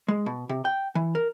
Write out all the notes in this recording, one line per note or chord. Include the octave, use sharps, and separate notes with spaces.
G#3
B2
C3
G5
E3
A#4